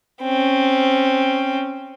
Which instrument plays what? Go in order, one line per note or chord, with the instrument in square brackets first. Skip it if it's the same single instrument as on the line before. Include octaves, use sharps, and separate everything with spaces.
[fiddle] C4 C#4